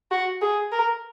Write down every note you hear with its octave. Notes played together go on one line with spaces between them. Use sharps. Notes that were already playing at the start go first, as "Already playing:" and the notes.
F#4
G#4
A#4